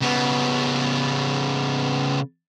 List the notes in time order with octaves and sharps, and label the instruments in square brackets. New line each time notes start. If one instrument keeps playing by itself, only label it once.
[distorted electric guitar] C#3 B3